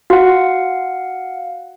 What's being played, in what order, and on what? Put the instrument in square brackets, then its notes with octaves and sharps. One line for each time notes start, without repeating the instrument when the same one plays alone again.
[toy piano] F#4 [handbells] F5 F#5